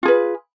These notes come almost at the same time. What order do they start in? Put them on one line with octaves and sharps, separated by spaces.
F4 G#4 B4